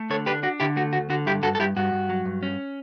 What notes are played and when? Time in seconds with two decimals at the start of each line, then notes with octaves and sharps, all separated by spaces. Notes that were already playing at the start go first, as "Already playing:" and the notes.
Already playing: A3
0.10 D3 A4 C#5
0.26 D4 G4 B4
0.43 D4 F#4
0.60 D3 E4 G4
0.76 A3 F#4
0.93 D2 F#4
1.10 D3 F#4
1.26 G2 E4 G4
1.42 G2 F#4 A4
1.55 A4
1.59 G2 E4 G4
1.76 G2 F#4
1.93 G2
2.10 F#3
2.25 G2
2.43 C#4